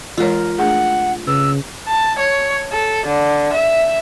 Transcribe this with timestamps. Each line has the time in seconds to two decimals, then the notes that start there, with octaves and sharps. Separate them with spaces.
0.18 E3 G#3 F4 A#4 C#5
0.59 A3 D4 G#4 F#5
1.27 C#3 B4 E6
1.88 A5
2.19 C#5
2.72 A4
3.07 D3
3.53 E5